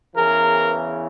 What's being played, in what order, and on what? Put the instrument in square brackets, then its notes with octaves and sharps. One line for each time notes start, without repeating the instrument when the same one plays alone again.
[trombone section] E2 C#3 E3 G#4 A#4